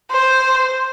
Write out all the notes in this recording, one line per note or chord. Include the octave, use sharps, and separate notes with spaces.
C5